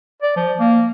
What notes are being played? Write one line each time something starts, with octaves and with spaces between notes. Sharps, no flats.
D5
F3
A#3